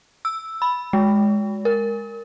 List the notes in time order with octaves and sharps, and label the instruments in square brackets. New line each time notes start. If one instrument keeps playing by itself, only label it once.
[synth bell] E6
B5
G#3
A#4